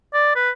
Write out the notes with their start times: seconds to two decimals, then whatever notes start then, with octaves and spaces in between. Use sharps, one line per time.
0.14 D5
0.36 B4